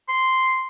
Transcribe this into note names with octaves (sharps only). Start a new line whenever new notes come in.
C6